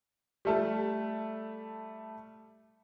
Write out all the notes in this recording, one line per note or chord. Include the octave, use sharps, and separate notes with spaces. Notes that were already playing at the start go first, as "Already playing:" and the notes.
G3 A3 A5